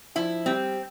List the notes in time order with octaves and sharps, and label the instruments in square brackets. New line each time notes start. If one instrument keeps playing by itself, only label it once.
[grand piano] F3 [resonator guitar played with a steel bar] E4
[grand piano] G3 [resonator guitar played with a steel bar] C4